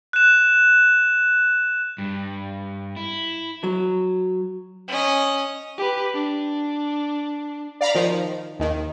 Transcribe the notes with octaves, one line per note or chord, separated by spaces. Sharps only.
F#6 E7
G2
E4
F#3
C#4 D#5
G4 B4
D4
D5 F5 A#5 B5
D#3 F3
D#2 D#3